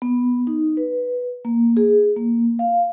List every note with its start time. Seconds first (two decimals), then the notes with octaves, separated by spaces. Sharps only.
0.02 B3
0.47 D#4
0.77 B4
1.45 A#3
1.77 G#4
2.16 A#3
2.59 F5